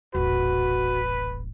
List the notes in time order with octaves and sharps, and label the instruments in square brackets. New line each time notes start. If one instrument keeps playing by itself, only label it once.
[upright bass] D#1 A1 [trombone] F#4 [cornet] B4